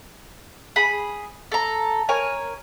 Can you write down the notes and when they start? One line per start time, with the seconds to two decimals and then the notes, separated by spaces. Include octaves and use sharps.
0.76 G#4 B5
1.52 A4 A#5
2.09 A#4 C#5 G#5